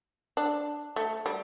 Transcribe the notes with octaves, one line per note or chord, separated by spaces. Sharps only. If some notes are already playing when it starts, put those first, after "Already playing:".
D4
A3
G3